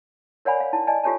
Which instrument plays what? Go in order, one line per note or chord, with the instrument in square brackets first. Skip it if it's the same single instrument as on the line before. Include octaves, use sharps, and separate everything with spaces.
[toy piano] A#4 C#5 D5 F#5 G#5 B5
F5
E4 A5
D5 D#5 G#5 A5
F4 G4 A4 C#5 G#5 A5